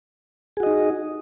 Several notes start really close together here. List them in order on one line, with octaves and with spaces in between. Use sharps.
G#4 F#4 D#5 D#4